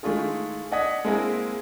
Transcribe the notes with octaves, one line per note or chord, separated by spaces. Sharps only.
D#3 G#3 A3 E4 F4 G#4
D5 D#5 F#5 D#6 G#6 B6
G#3 A#3 C4 E4 G#4 A#4